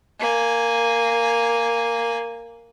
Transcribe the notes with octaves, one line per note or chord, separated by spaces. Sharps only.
A#3 G#5